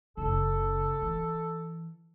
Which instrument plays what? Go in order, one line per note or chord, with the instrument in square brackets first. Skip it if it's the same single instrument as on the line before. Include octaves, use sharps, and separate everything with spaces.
[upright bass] F#1 C#3 [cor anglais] A4
[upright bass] E3